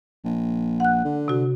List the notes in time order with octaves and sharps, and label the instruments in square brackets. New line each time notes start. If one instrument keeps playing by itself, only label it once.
[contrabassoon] A#1
[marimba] F#5 F#6
[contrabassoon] D3
[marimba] C3 F#4